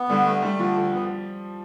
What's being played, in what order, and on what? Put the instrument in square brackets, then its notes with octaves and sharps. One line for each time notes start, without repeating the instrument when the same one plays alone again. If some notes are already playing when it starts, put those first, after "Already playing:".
Already playing: [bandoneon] B3
[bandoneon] D3 [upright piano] G3
[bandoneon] A3
[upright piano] G3 [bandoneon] A3
[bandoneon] D3 [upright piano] F3
[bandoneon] D2
B3